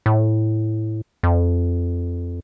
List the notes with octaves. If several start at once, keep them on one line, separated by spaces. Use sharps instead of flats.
A2
F2